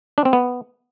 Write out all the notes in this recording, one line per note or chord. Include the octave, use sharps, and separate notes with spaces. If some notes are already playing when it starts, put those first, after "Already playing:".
D4
C4
B3